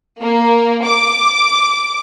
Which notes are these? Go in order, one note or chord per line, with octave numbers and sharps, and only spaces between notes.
A#3
D6